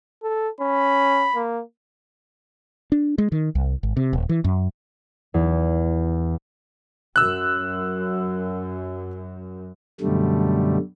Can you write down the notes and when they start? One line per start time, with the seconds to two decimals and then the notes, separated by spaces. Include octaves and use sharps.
0.23 A4
0.61 C#4 B5
1.35 A#3
2.92 D4
3.18 G#3
3.32 D#3
3.55 C2
3.83 G#1
3.97 C3
4.13 D#1
4.29 E3
4.44 F#2
5.34 E2
7.16 F#2 E6 F#6
10.01 F#2 B2 D3 G3 A3